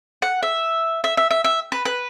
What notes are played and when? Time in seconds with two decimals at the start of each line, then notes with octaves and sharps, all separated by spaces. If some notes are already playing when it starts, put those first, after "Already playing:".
0.22 F#5
0.43 E5
1.04 E5
1.17 E5
1.31 E5
1.44 E5
1.72 B4
1.85 B4